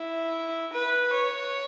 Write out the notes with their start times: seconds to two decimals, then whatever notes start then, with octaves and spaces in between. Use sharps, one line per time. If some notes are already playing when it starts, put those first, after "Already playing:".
Already playing: E4
0.73 B4
1.14 C#5